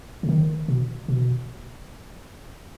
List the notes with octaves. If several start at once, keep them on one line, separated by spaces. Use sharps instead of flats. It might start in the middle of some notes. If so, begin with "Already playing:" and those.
C#3
D#3
B2
B2